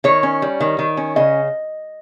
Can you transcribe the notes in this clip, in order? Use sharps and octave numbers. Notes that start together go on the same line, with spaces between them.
D#3 C#5
C#4
G3
D#3
D#3
C#4
C#3 D#5